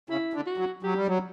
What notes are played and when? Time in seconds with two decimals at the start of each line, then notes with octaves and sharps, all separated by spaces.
0.10 C#3 E4
0.34 D3
0.46 F#4
0.58 F#3
0.83 F#3 G4
0.96 G3
1.07 F#3